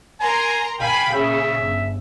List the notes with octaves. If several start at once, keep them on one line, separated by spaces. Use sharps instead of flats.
A#4 G#5 A#5 C6
F5 G5 G#5 B5
A#2 C#3 E5
G1